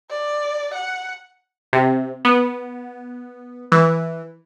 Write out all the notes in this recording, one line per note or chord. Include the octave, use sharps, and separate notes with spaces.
D5
F#5
C3
B3
E3